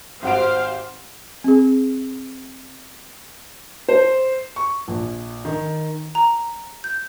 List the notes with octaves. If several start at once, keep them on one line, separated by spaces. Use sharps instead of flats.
G#1 G4 C5 F5 F#5 D7
C4 G#4
C5
C#6
A#1
D#3
A#5
G6